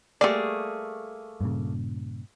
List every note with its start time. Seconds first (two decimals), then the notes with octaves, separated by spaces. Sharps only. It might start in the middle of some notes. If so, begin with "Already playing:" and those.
0.21 G3 A3 A#3 G#4 D5
1.41 G2 A#2 C#3